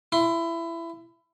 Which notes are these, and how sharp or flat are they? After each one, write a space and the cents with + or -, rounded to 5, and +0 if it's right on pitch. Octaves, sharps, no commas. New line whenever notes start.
E4 +20 C6 +10